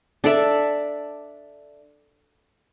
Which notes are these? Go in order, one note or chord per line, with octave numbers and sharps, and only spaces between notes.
D4 A4 D5 E5